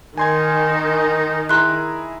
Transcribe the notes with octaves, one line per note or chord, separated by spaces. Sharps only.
D#3 D#4 G#5 C6 G#6
E4 G#4 A#5 C6 F#6